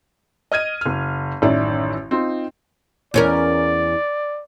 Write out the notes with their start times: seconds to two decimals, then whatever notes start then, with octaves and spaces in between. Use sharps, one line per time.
0.52 D#5 F6 G#6 D#7
0.81 F#1 F6
1.42 A1 F#2 D#3 D5 E5
2.11 C4 D#4 F4
3.14 E2 C#4 A#4 D5